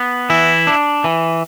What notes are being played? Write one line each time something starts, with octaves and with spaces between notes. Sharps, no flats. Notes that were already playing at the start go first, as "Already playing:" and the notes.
Already playing: B3
E3 E4
D4
E3